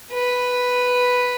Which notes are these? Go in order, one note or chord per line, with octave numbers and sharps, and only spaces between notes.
B4